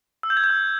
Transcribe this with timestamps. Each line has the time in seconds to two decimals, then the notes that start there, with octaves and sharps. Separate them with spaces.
0.23 E6
0.30 G6
0.37 G#6
0.44 G6
0.50 E6